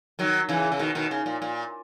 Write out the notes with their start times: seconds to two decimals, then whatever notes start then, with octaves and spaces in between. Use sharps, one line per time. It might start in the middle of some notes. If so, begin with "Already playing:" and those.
0.19 D#3 F#3
0.49 C#3 E3
0.72 C#3
0.79 B2 D#3
0.95 B2 D#3
1.11 C#3
1.26 A#2
1.42 A#2